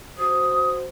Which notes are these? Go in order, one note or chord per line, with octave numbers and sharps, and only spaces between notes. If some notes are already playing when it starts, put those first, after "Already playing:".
F#4 C5 D#6